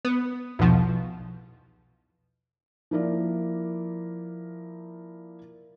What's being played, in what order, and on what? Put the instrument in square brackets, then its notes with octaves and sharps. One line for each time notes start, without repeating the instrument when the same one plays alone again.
[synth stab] B3
B1 E2 B2 F3
[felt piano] F3 A#3 E4 A#4 D5